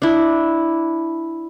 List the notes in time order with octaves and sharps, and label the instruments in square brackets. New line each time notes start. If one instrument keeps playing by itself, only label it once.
[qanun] D4 E4